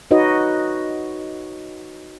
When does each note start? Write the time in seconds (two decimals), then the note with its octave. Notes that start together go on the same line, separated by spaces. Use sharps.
0.11 D#4 F#4 B4 C#5 D#5